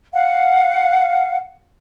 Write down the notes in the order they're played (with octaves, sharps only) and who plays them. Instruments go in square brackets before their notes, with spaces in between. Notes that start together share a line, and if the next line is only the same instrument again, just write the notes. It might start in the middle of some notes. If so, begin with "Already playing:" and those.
[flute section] F5 F#5